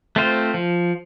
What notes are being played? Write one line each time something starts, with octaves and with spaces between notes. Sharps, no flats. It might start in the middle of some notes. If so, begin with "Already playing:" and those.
A3 C4 F4 C5
F3